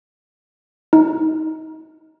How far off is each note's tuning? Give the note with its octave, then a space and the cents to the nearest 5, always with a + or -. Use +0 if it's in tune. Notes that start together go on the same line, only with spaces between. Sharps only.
D#4 +25